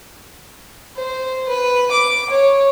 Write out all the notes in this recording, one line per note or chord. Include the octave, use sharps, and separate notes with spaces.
C5
B4
D6
C#5